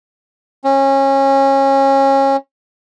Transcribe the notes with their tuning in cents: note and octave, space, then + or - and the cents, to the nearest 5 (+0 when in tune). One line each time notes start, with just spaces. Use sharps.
C#4 -25